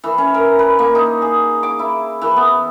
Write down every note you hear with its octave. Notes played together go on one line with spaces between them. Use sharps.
E3
C#4
A#4
B4
A#3
D#4
G#4
D6
E4
E3
B3